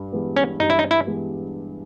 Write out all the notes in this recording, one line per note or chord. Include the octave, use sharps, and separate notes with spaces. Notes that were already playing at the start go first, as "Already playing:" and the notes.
Already playing: G2
E3 G#3 B3
C#4
G2 D#4
E4
D#4
E4
E3 G#3 B3